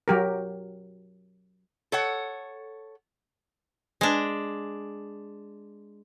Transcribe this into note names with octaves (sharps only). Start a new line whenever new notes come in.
F#3 G4 A#4
A4 C#5 F#5
G#3 D4